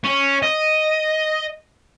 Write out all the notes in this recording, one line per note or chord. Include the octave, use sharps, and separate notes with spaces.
C#4
D#5